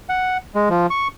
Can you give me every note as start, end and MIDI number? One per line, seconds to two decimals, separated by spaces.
0.09 0.37 78
0.55 0.69 56
0.70 0.87 53
0.90 1.08 85